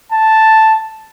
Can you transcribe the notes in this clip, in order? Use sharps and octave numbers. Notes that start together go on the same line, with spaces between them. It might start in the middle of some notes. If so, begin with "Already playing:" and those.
A5